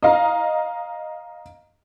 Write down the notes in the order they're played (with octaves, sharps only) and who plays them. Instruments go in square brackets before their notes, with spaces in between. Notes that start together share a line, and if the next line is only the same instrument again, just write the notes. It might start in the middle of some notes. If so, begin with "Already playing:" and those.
[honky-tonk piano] D#5 F5 A#5